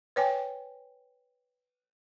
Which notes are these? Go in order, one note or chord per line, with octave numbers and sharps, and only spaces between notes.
B4 C#5 G5 G#5